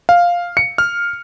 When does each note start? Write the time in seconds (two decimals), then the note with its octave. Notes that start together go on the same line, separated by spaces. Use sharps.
0.09 F5
0.57 C#7
0.78 F6